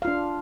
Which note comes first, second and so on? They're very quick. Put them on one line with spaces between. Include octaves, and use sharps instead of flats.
F5 F4 D4